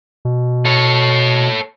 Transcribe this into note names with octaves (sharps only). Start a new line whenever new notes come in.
B2
A4 C#5